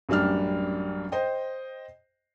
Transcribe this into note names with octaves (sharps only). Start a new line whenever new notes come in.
A1 F#2 G3 D4 F6
C5 D#5 G5